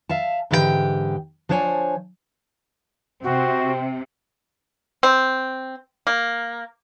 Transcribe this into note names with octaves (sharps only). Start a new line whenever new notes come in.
E5 F5 A5
G#2 D3 E3 G4 A4 G5
F3 D4 C5 C#5 G5 G#5
C3 C4 F#4
C4
A#3